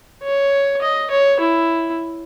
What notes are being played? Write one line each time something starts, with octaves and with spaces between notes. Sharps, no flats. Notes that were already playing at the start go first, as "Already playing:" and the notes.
C#5
D#5
C#5
E4